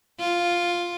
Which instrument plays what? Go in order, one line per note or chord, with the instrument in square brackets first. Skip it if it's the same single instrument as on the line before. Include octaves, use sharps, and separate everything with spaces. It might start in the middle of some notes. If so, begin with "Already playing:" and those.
[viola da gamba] F4